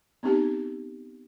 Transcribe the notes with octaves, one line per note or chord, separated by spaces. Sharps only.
B3 C4 D#4 G4 A5